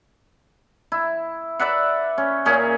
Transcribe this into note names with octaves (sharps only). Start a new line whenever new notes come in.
E4
B4 D5 E5 F#5
C#4
A#2 C#4 G#4 G5